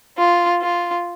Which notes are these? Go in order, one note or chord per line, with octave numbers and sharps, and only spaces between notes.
F4
F4